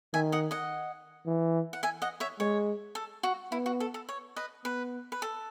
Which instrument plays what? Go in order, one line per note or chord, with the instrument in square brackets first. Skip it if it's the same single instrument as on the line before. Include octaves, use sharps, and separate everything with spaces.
[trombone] D#3 [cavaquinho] E5 G#5
[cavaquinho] D#5 F#5
D#5 F#5
[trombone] E3
[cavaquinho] F#5
E5 G#5
D#5 F#5
C#5 E5
[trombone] G#3 [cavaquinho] C#5
[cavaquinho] A4
F#4
[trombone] B3 [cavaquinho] E4
[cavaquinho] F#4
A4
A4
C#5
B4 D#5
[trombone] B3 [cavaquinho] B4
[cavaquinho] B4
A4